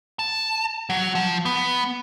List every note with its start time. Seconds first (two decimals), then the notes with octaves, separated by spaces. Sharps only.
0.19 A5
0.90 F#3
1.15 F3
1.45 B3